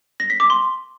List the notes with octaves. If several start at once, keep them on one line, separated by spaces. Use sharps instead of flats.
A#6
B6
D6
C6